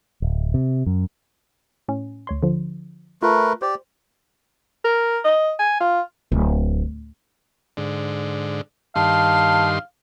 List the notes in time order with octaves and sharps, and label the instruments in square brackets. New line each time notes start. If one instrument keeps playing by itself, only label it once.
[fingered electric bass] D1
C3
F#2
[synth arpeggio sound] A2 C#4
D2 C#5 C6
D3 F3
[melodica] A3 A#4 B4 [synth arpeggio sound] F4
[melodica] G4 D5 [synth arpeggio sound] C5
[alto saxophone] A#4
D#5
G#5
F4
[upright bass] D1
[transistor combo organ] G#2 D3
[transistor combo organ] G2 D#3 C6 [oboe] F5 [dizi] A5